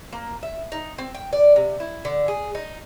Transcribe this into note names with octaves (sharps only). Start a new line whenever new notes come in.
A#3
E5
D#4
C4
G5
D5
C3
E4
D3
G#4
D#4